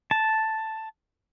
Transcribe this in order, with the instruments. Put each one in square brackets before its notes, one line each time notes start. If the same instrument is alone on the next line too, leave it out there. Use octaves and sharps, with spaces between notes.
[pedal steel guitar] A5